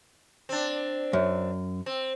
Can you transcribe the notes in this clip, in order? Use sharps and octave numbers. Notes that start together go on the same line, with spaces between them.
C4 D4
F#2
C4